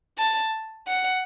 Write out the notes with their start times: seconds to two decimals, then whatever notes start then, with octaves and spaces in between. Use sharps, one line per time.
0.18 A5
0.87 F#5